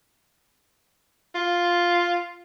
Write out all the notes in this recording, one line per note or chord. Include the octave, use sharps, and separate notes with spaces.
F4